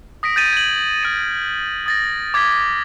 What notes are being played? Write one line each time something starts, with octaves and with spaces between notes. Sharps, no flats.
D#6 A#6 B6 D7
G6 A6 D#7
G#6 F#7
F6 D7 D#7
D#6 A6 A#6
D6 G#6 A6 B6 G7